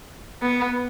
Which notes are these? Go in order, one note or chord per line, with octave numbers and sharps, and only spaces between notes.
B3